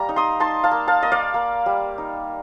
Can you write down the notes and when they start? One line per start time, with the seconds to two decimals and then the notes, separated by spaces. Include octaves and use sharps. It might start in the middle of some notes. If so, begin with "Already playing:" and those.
Already playing: G3 A#3 A#5
0.09 D#4
0.16 C6 D#6
0.40 D#4 A5 C6
0.64 F5 A5
0.71 A#3
0.88 F5 A5
1.03 A#3 D#5
1.12 D5 F5
1.34 A#3
1.66 G3
1.98 D#4